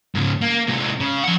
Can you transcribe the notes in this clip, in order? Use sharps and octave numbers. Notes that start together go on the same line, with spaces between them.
G#2 C#3
A#3
C3 G#3
C#3
F3 F#5